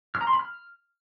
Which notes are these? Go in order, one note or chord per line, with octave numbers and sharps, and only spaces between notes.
F6
A#5
C6
B5
F6